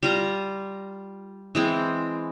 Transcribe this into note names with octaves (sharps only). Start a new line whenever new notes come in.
G3 F4 A#5
E3 G#3 C4